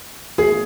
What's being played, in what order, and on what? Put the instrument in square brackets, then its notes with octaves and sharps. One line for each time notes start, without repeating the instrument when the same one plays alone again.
[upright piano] G#4